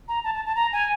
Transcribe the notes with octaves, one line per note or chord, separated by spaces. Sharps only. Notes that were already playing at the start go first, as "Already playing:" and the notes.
A#5
A5
A5
A5
A#5
G#5